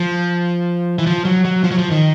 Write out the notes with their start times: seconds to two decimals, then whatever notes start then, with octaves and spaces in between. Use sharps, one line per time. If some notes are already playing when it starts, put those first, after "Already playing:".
Already playing: F3
0.99 E3
1.07 F3
1.25 F#3
1.45 F#3
1.64 F3
1.71 F#3
1.78 F3
1.91 D#3